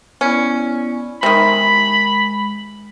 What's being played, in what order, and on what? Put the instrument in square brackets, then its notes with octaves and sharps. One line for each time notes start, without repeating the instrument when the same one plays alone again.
[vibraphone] B3 E4 D5 [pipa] C#4
[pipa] C3 D#3 [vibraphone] G#3 [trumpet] B5